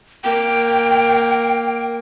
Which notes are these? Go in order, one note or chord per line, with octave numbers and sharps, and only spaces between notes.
A#3 G5